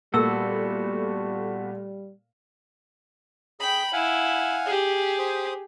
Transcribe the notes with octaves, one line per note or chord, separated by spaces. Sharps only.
A#2 G3 A3 B3 F#4 A4 A#4 E6
G#4 G5 B5
E4 F5 F#5 G#5
G4 G#4
C5 D#6